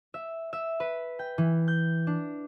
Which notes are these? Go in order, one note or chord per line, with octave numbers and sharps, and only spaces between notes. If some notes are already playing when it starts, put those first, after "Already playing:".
E5
E5
B4
G5
E3
G6
D4